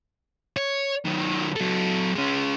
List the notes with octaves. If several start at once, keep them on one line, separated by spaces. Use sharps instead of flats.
C#5
D#3 F#3
F#3 A4
G#3 C#4